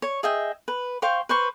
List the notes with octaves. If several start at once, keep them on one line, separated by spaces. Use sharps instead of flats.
C#5
G#4 D#5 E5 G5
B4
C5 F5 G5 C#6
B4 C5 C#6